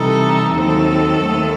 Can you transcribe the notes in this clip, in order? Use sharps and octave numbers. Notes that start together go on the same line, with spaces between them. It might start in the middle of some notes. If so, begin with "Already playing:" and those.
Already playing: C3 E3 G3 D#4 A4
D#2 D#3 F#3 C4 A4
D#2 D#3 A3